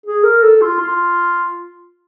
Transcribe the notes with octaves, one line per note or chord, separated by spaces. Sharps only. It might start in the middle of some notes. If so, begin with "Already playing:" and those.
G#4
A#4
A4
F4
F4